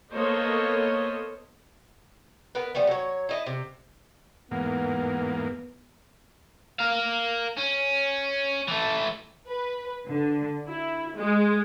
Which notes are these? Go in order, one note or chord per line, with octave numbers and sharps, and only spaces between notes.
A#3 B3 A4 C5 C#5 D#5
B3 A#4 B4
F3 G3 A3 B3
F#3 C#5
E4 D#5 A5
C3
E2 G#2 A#3 B3 F#5
A#4 F5
C#4
E3 A3
B4
D3
E4
G#3